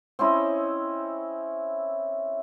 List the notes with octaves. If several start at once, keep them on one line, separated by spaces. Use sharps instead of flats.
C4 C#4 E4 D#5